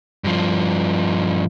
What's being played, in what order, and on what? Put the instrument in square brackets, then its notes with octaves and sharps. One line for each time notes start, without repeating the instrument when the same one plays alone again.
[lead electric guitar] G2 F3